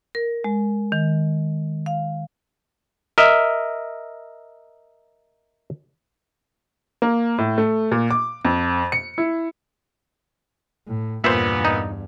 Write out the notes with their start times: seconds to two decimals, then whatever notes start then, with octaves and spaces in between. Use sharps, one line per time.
0.15 A#4
0.44 G#3
0.92 D#3
1.86 F5
3.18 A#4 D#5 E5
7.02 A#3
7.38 A2
7.58 A3
7.92 A#2
8.11 D6
8.45 F2
8.92 C#7
9.18 E4
10.87 A2
11.24 E2 G2 A#2 B3 C5 E5
11.65 D#4